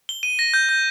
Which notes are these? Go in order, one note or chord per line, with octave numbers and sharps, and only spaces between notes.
G7
D#7
A#6
G6
G6